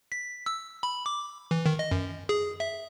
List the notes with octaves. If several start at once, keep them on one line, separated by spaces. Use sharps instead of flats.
B6
E6
B5
D6
E3
D#3
D#5
F#2
G#4
E5